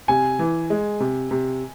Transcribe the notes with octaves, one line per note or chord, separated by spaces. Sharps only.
C3 G#5
E3
G#3
C3
C3